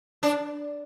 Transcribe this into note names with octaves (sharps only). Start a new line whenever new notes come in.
D4